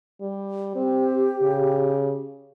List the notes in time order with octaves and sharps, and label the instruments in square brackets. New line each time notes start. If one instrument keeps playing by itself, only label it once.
[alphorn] G3
[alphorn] C4 [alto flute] G4
[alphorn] C#3